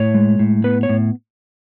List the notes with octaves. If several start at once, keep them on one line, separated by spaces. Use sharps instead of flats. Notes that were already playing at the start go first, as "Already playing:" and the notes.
Already playing: A2 C#5
G#3
A2
B3 B4
C#5
A2